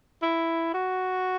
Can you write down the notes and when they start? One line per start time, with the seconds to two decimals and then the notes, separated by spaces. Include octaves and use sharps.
0.23 E4
0.74 F#4